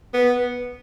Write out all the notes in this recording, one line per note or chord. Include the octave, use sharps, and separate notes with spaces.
B3